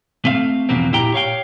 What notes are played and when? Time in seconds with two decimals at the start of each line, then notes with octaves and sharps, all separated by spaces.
0.25 A3 C4 F5
0.69 E2 B2 F3 A#3 C4
0.93 A#2 E4 G4 G5 A#5
1.14 C#5 F5 G5